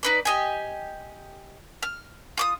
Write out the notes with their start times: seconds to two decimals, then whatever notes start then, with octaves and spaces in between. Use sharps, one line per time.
0.03 D#4 B4 D5
0.25 G4 D#5 G#5
1.83 F6
2.37 F4 D6 D#6